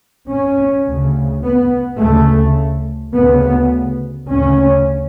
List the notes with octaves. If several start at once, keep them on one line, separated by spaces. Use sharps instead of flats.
C#4
D2 C#3
B3
D2 C#3 A3
D2 C#3 B3
D2 C#3 C#4